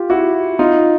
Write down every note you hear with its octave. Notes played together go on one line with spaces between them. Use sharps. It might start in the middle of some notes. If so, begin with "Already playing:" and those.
Already playing: F4 G4
E4 F#4
D#4 F4